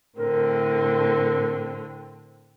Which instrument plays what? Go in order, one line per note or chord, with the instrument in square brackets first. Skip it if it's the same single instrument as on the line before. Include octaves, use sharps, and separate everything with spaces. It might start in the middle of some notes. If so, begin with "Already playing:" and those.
[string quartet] A2 D3 C4 [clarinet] A#4